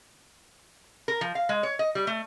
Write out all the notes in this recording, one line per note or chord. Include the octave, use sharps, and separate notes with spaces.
A#4
F3
F5
G#3
C#5
D#5
G3
A3